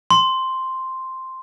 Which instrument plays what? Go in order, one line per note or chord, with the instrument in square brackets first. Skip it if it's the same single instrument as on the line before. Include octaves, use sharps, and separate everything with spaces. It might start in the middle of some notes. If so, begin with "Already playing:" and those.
[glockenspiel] C6